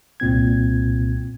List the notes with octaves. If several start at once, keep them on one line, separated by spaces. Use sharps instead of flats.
C2 A#2 C4 G#6